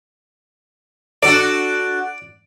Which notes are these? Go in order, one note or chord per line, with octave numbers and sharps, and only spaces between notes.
D4 F#4 A4 D5